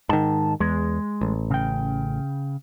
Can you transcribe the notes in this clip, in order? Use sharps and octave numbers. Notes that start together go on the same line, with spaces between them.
G#2 D#3 A5
E2 G#3
A1
C#3 G5